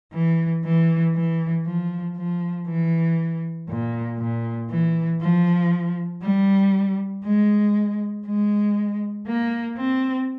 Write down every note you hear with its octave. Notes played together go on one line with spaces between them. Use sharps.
E3
E3
E3
F3
F3
E3
A#2
A#2
E3
F3
G3
G#3
G#3
A#3
C4